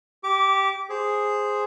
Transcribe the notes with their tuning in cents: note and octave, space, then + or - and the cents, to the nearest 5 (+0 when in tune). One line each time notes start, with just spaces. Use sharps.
G4 -10 D6 -25
G#4 +0 C5 +0